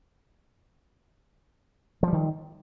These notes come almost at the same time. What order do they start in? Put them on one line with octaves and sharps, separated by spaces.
F3 G3 D#3